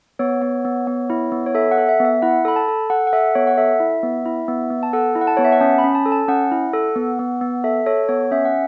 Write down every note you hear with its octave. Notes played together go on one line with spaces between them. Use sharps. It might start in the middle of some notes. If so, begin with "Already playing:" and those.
B3 C#5
B3
B3
B3
E4
B3
C#5
A4 E5
F#5
A4
E5
B3
E5
E4 F#5
A4 B5
A5
A4
A4 F#5
F#5
A4 E5
B3 C#5
F#5
A4 E5
E4
B3
E4
B3
B3
A5
A4 F#5
E4
F#5
A5
B3 C#5
E5
F#5
C#4 A5
B5
C#4
A5
A4
A5
C#4 F#5
E4
A4
B3
B3
B3
A4 E5
A4 C#5
B3 C#5
C#4 E5
F#5